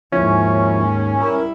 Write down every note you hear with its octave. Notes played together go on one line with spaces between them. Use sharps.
D#2 G#2 F3 C#4 E4
G3 E4 A#4